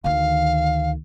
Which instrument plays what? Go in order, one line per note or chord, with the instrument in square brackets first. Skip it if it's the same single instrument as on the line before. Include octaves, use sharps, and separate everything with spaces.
[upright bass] D2 D#3 [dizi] F5